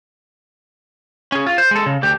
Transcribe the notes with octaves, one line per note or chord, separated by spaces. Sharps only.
C#4 G#4
F4
C5
G#3 A4
C#3
D2 G4